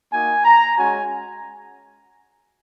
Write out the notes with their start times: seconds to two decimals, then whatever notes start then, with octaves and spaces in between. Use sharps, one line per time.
0.11 A#3 D#4 F#4 G#5
0.45 A#5
0.78 G#3 C#4 F#4 G#5